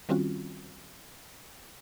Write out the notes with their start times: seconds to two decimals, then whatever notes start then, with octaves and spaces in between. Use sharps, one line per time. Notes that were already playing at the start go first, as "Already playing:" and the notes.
0.09 D#3 G3 C4 C#4 F4 F#4